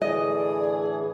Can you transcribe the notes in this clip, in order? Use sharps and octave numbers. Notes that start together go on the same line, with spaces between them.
A2 D3 E3 G#4 D5 D#5